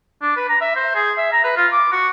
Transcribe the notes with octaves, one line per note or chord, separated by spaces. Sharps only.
D4
B4
A#5
E5
C5
G#4
E5
A#5
B4
F4
D6
F#4